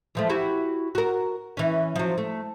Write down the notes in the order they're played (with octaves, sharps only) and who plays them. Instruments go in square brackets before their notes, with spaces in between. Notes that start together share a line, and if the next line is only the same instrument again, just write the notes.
[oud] E3 F3 A3
E4 F#4 G4
F#4 A#4
E3 C#4
F3 F#3
A3